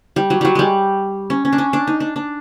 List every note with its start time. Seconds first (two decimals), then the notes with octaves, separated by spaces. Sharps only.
0.16 G3
0.30 F#3
0.41 F#3 G3
0.55 G3 G#3
1.30 C#4
1.45 C#4
1.53 D4
1.58 C#4
1.73 D4
1.87 D#4
2.00 D4
2.16 D4